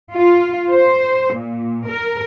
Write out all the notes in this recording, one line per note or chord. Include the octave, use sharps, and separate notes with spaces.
F4
C5
A#2
A#4